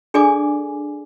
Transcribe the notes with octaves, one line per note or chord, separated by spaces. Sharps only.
D4 G#4 A4 D5 G#5 D6